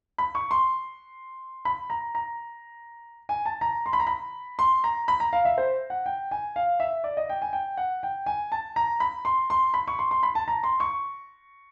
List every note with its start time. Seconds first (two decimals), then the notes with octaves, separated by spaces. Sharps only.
0.18 B5
0.35 C#6
0.51 C6
1.65 B5
1.90 A#5
2.15 A#5
3.29 G#5
3.45 A5
3.61 A#5
3.86 C6
3.93 B5
4.00 A#5
4.07 B5
4.59 C6
4.84 A#5
5.08 B5
5.20 A#5
5.33 F5
5.45 E5
5.58 C5
5.90 F#5
6.06 G5
6.31 G#5
6.56 F5
6.80 E5
7.04 D5
7.17 D#5
7.29 G5
7.42 G#5
7.53 G5
7.77 F#5
8.03 G5
8.26 G#5
8.52 A5
8.76 A#5
9.00 B5
9.25 C6
9.50 C6
9.74 B5
9.88 C#6
9.99 C6
10.11 C6
10.23 B5
10.35 A5
10.48 A#5
10.64 C6
10.80 C#6